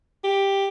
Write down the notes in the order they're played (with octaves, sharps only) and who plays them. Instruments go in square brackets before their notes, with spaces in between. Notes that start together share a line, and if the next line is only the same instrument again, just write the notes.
[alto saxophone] G4